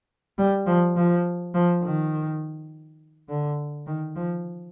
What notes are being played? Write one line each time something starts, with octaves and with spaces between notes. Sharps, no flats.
G3
F3
F3
F3
D#3
D3
D#3
F3